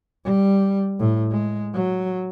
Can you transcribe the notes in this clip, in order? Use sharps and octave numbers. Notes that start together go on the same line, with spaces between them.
G3
A2
G#3
F#3